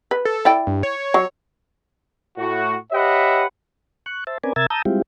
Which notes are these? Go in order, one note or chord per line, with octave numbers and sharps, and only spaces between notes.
B4
A4
E4 D5 G5
G2
C#5
F#3
A2 F#4
G4 B4 C#5 D#5 E5 F#5
C#6 F#6
C5 E5 A5
C4 C#4 A#4 B4 D5 G#5
C3 A#4 E5 E6 G#6 A6
A5 A#5 D#6 E6 G6
G3 G#3 C4 E4 F4 G4